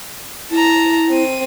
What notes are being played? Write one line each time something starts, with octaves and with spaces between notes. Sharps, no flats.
E4 A5 A#5
C4 D#7